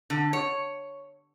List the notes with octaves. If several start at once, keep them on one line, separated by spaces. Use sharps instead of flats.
D3
C#5